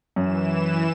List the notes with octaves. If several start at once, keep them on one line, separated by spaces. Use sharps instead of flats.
F#2 E3 E7